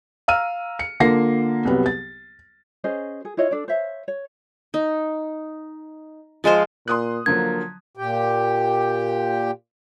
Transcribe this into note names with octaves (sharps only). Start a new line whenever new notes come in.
F5 A#5 E6 F6 D#7
C#7
D3 A#3 F4 A#4 A#6 C7
C2 F#3 G3 B3
A6
C#4 G#4 C5 D#5
G#4
E4 F4 C#5 D#5
D4 A4 D5
C5 C#5 E5 F5
C#5
D#4
F3 G#3 F4 C5
A#2 C6 D#6 F#6
D3 F3 F#3 A#3 G#6
A#2 G4 G5